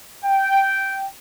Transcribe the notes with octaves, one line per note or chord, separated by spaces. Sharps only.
G5